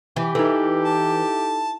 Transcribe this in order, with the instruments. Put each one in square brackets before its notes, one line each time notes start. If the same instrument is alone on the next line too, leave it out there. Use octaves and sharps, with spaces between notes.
[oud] E3 [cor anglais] G4
[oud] E3 [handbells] D#4 A4
[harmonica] A5